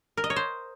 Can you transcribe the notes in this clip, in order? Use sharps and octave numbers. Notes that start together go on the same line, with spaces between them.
A#4
D#5
C#5
C5